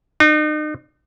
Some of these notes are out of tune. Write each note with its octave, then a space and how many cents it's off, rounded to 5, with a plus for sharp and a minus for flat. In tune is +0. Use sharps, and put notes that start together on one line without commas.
D#4 -40